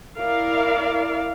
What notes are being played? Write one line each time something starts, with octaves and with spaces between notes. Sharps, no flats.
E4 A#4 D5 F5